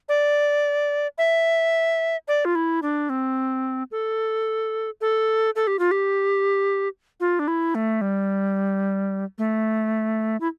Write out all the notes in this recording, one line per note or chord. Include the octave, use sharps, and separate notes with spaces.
D5
E5
D5
F4
E4
D4
C4
A4
A4
A4
G4
F4
G4
F4
D4
E4
A3
G3
A3
E4